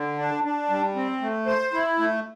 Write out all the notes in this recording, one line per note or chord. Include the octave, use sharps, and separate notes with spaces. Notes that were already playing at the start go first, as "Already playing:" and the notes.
Already playing: D3
D4
D4
G3
C4
A3
C5
E4
A3